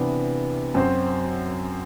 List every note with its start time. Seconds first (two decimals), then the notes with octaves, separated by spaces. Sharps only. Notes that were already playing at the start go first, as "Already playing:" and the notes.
Already playing: C3 E3 B3 D4
0.74 F#2 F#3 C4 F#4 C5